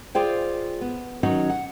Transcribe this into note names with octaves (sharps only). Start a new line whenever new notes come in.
F4 G#4 C5 D5 F5 G5
B3
D#3 F#3 C#4 D#4 F#4 C#5
F#5